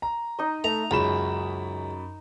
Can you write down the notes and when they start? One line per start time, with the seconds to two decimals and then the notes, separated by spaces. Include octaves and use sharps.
0.02 A#5
0.39 D#4 D#5
0.64 A3 A#5
0.91 C#2 F#2 B5 E7